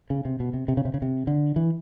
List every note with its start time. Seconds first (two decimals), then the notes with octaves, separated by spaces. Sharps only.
0.10 C#3
0.25 C3
0.40 B2
0.54 C3
0.68 C3
0.77 C#3
0.85 C3
0.94 C#3
1.02 C3
1.27 D3
1.56 E3